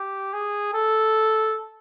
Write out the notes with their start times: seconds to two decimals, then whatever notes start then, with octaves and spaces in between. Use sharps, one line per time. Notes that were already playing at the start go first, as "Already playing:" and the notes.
Already playing: G4
0.33 G#4
0.74 A4